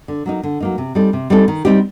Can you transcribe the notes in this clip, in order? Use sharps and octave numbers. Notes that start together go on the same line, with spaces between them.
D3
F#3 A#3 D#4
D3
F#3 A#3 D#4
C3
G3 C4 D#4 A4
C3
G3 C4 D#4 A4
D#3
G3 C4 D#4 G4